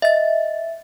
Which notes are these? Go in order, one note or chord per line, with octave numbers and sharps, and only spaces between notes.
D#5 E5 A6